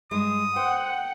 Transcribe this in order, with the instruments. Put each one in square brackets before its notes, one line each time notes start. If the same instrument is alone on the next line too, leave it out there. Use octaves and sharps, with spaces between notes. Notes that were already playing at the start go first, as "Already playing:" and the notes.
[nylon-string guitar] G2 G#3 [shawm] D#6
[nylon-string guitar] C5 [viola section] F#5 [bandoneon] G5